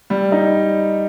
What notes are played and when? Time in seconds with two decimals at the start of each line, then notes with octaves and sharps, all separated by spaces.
0.10 G3
0.32 D#4